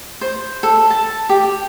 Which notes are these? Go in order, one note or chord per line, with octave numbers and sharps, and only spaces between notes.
C5
A4
A5
G4